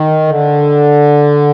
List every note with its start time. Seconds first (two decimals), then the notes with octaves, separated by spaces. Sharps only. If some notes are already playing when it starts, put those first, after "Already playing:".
Already playing: D#3
0.28 D3